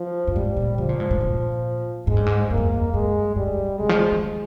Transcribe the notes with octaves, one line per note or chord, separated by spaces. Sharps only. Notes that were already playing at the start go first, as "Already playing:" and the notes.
Already playing: F3
G2
G#2 G3
A#2
D3 F3
A#2
G#2
G#2
A#2
G#2 G#3
G2
G#2
G2 A#3
F2
F2
G2 G#3
G2 G3
G2
G#2
C3 G#3
F3
F3
D#3